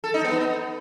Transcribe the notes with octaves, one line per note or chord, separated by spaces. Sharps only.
A4
D#4
B3